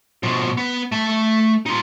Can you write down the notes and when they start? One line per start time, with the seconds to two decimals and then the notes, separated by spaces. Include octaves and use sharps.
0.23 B2 F3
0.57 B3
0.92 A3 A5
1.66 D#4 F4